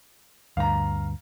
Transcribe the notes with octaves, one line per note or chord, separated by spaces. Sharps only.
D2 G2 F5 A#5